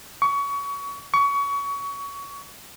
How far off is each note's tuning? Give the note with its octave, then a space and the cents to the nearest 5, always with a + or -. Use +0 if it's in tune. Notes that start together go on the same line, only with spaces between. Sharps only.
C#6 +25
C#6 +25